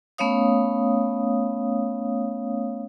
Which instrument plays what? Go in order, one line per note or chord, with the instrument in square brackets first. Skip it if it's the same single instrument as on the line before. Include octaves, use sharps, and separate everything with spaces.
[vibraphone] A3 B3 C#4 C#5 F5 D#6